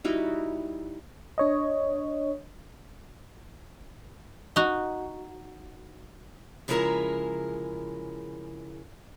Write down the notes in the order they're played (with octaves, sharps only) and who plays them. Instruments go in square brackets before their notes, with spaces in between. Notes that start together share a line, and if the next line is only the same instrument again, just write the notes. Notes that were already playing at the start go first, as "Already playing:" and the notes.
[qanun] G3 D#4 E4 F#4
[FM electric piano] D4 C#5 D#5
[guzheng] D#4 F#4
[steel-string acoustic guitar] C#3 F3 G#3 E4 A#4 A#5